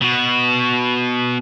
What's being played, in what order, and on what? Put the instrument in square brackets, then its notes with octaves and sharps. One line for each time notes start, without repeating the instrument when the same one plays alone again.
[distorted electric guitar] B2 F#4